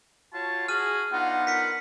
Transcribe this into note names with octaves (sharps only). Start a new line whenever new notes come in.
F4 F#4 C#5 A5
F#4 G#4 F6 D#7
B3 D4 D#4 F4 F#5
A#4 B6 C#7